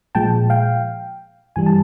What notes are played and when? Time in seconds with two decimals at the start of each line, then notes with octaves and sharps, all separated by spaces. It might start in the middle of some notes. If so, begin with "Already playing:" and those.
0.15 A#2 F3 G#3 G5 A5
0.50 F5 G5
1.56 G2 E3 G3 G#5
1.66 A5